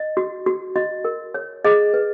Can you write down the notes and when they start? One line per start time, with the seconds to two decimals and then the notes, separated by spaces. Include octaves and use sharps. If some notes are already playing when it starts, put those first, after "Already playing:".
Already playing: D#5
0.17 F#4
0.46 F#4
0.76 F#4 D#5
1.05 A#4
1.34 C#5
1.65 G#4 D#5
1.94 B4